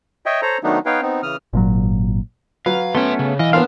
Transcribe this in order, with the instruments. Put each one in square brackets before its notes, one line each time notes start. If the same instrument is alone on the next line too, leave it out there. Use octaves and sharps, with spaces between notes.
[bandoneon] C#5 D#5 E5 G5
A4 C5 C#5 A#5
D#3 F#3 A3 B3 D4 D#4
B3 D#4 B4 C#5 F5 G5
B3 C4 D#4
C#3 E3 D#6 F6
[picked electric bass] G#1 A#2 F#3
[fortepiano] F#3 [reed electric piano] B4 [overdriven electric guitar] F5
[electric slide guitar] A3 B3 C#4 [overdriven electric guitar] E5 C6
[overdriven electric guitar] C#3
[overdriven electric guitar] B1 D#5 [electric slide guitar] E3 [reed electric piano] F5
[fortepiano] A#3 B3 [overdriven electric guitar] D4 [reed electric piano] F5 C6 F6